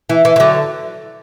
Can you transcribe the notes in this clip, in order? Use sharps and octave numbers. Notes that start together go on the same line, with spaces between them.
E3
E3
E3
D3 F#3